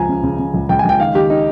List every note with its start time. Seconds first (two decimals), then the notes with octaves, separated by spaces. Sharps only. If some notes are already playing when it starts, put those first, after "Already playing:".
Already playing: C#2 F3 G#5 A#5
0.09 C#3
0.24 C#3
0.39 C#3
0.54 C#2
0.69 C#2 G5
0.79 G#5
0.85 C#2 G5
1.00 D#3 F5
1.15 D#3 G4
1.30 D#4